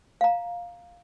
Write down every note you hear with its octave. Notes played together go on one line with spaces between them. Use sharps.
F5 A#5